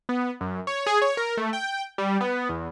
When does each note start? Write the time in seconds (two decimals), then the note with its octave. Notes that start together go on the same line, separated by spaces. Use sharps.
0.09 B3
0.41 F#2
0.67 C#5
0.86 G#4
1.02 C#5
1.17 A#4
1.37 A3
1.53 G5
1.98 G3
2.21 B3
2.49 E2